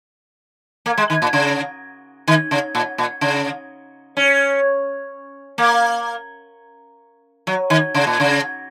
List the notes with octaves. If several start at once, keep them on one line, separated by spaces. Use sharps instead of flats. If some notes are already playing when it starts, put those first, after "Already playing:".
A#3
G#3
D#3
A#2
C#3
D#3
C#3
A#2
A#2
C#3
C#4
A#3
F#3
D#3
C#3
A#2
C#3